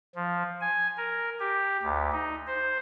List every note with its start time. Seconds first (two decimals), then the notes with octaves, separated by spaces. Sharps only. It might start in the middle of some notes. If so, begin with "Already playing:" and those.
0.15 F3
0.61 G#5
0.97 A#4
1.40 G4
1.83 D2
2.12 D#4
2.47 C5